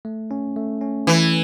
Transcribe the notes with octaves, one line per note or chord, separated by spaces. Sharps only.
A3
C#4
A3
C#4
E3 A3